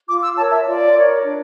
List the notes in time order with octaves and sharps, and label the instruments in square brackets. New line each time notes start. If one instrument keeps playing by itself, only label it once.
[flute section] F4 D6
E6
A#4 C#5 A5
E5
F4 D5
A#4 C#5
D4